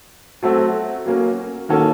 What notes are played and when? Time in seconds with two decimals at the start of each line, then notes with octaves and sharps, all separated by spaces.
0.43 F#3 A3 C4 F#4 A4
1.06 F#3 A#3 C#4
1.69 D#3 A#3 C#4 F#4 A4